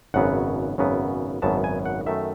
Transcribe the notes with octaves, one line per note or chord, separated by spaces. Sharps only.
G#1 F#2 C#3 F#3 B3 F#5
G#1 F#2 C#3 F#3 B3
G#1 F#2 C#3 F#3 B3 A5
G#5
F#5
F#2 D#3 A3 E5